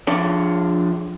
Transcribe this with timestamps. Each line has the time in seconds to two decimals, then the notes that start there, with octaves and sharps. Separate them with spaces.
0.07 F3 D4 C#5